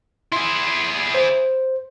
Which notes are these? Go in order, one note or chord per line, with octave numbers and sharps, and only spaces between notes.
E4 G#4 C6
C5